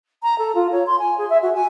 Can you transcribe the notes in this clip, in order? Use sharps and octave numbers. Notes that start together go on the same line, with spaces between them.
A#5
A4
F4
C#5
C6
G#5
G#4
E5
F#4
G#5